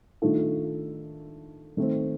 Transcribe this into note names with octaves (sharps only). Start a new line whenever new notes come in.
D#3 A3 D4 F4 A4
D#3 A3 C4